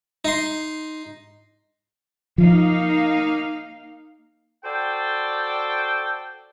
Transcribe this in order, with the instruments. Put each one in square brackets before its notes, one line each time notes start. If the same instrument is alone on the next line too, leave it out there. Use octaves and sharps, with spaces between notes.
[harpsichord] D#4 C6
[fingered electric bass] F3 [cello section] A#3 D#4 F5
[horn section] F#4 A4 C5 D5 G5